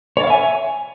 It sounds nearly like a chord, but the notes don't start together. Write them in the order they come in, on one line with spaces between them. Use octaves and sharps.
C#5 D5 F5 E5 G#5